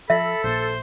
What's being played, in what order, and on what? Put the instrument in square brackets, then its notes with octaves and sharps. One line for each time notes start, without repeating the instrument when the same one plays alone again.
[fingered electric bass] F3 [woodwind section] A4 [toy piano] E5 [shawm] B5
[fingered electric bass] A#1 A#2 [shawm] C5